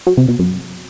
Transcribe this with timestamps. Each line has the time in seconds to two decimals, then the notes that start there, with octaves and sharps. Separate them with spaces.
0.07 F#3
0.17 C3
0.28 B2
0.39 F#2